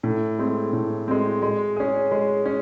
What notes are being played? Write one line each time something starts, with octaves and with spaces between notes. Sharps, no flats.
A2
G#3 C4
A2
G#3 C4
G#3
C#4 G#4
G#3
C#4